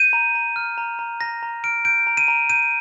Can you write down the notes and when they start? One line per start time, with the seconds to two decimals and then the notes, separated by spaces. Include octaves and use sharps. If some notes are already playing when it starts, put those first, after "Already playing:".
Already playing: G6 D#7
0.13 A#5
0.35 A#5
0.56 F6
0.78 A#5
0.99 A#5
1.21 A#5 A#6
1.43 A#5
1.64 F6 D7
1.85 G6 D7
2.07 A#5
2.17 D#7
2.28 A#5
2.50 G6 D#7